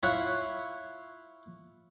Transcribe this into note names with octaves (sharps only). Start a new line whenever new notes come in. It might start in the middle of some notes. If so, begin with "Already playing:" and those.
E4 F4 C#5 E5 F#5